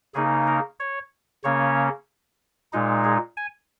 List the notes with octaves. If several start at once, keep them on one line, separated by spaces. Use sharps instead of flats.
C#3 A#3 D#4 G#4
A#4
C#5
C#3 A#3 C#4 C#5
A#2 G#3 D#4
G#4
G#5